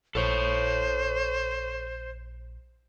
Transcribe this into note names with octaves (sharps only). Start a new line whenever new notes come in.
A#1 A4 C5 C#5